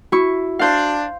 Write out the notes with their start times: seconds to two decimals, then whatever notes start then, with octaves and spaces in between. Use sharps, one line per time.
0.12 E4 F#4 C#6
0.59 D4 C5 F5